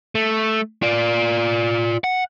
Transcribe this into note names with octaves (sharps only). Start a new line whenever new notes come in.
A3
F4 D5
F#5